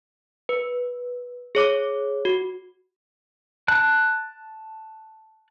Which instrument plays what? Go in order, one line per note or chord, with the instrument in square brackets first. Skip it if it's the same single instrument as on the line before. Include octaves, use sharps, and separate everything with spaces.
[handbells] B4
G#4 C#5 D6
F#4
[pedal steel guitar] A5 F#6